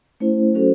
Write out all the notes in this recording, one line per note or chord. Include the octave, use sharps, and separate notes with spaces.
A3 C#4 E4 C5
F#3 C#4 F#4 A4 C5